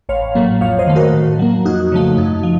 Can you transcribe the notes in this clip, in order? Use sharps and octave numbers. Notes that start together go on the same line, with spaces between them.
A1 C#5 F5
A2 F#3 A#3
F2 C#5 F5
C5 D#5
D#3 A3
F#4 A#4
A2
F#3 A#3
F2 D#4 F#4
C#3 F3 A3
F#2 D#4
F3